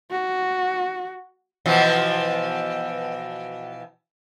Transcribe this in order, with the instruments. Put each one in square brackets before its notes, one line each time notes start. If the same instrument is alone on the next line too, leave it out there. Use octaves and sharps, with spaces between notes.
[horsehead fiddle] F#4
[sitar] B2 E3 F3